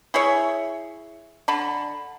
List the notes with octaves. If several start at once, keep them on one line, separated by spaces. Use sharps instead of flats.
E4 G#4 C#5 E5
D3 A5 B5